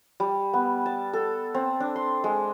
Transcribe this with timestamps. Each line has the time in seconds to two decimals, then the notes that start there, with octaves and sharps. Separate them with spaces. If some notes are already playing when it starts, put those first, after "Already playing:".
0.20 G3
0.53 B3
0.86 A5
1.13 A4
1.54 C4
1.80 D4
1.96 C6
2.24 G#3